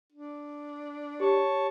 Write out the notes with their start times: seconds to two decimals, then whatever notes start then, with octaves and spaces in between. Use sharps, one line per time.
0.13 D4
1.20 G4 C#5 A5 C#6